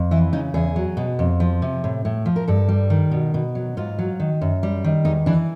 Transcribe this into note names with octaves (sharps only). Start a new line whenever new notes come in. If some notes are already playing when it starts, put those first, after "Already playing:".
Already playing: F2
E3 E4
C#3 D#4
E2 G#4
F#3
B2
F2
F3
C3
A2
A2
F3
A#4
G2 A4
G3
D#3
B2
B2
F#3
G#2 F4
F#3
D#3
F#2
G3
D#3
E2 D#4
E3 D4